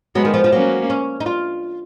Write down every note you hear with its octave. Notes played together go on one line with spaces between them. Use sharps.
F#3 G#3 B3
D#3
F3
F3
F#3 A#3 C#4
C#4
D#4
F4